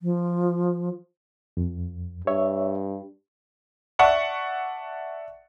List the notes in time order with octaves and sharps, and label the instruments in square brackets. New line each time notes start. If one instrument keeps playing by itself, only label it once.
[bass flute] F3
[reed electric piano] F2
[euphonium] G2 [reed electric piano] C#5 E5
[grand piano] D5 E5 F#5 A5 C#6